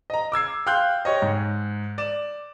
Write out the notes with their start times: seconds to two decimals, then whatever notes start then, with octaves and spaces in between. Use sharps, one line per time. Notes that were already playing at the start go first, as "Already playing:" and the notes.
0.10 D#5 A#5
0.32 D6 E6 G#6 C7
0.67 F5 G5 C6 F#6 G6
1.05 G4 C#5 D#5
1.22 G#2
1.98 D5 E7